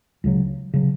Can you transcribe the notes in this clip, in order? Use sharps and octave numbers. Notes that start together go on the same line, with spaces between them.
C#2 C#3 F#3
C#3 F#3